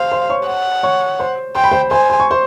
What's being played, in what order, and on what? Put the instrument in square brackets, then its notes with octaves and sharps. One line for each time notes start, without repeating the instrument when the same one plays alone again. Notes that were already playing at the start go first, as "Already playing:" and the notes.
Already playing: [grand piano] C5 C6 [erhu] F5
[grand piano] C5 C6
C#5 C#6
[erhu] F#5
[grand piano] C#5 C#6
C5 C6
[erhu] G5 [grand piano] C6
[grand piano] B5
C5 C6
[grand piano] C5 C6 [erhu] G#5
[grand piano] C6
C#6
C5 C6